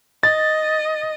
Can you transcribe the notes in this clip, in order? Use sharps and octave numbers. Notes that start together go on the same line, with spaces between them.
D#5 A6